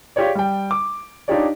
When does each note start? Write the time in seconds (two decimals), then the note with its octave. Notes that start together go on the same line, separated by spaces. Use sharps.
0.16 F4 G4 G#4 C#5 D5
0.35 G3 G5
0.71 D6
1.28 D4 D#4 F4 G4 C#5 D5